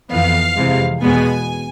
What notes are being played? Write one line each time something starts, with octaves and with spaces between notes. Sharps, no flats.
F2 E3 B3 F5
F2 C3 E3 G#3
E2 B2 G#3 B3 G#5